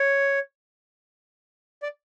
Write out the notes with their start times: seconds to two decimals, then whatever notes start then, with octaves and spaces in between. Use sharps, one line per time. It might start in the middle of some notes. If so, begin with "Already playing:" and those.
Already playing: C#5
1.83 D5